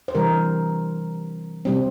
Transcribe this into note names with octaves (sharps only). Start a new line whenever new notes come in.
C5
C3 E3 G3 A#4
C3 G3 C4